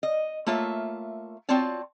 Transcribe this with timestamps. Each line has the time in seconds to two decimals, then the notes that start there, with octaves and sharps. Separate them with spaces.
0.03 D#5
0.46 A3 A#3 F4 C#5 E5
1.49 C4 F4 F#4 C#5 D5 A5